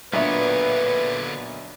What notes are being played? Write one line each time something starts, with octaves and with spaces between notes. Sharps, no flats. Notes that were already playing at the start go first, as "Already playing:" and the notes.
B1 A#2 D3 B3 D4 B4 C#5 E5